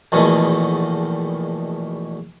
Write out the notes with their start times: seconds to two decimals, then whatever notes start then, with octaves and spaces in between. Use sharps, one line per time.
0.12 A#1 E2 B2 D#3 A3